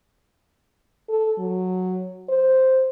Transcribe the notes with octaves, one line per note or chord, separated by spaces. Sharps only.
A4
F#3
C5